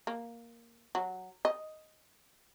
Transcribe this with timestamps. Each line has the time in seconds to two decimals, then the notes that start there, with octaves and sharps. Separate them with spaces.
0.07 A#3
0.95 F#3
1.45 D#5